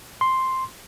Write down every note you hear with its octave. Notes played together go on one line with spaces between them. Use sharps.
C6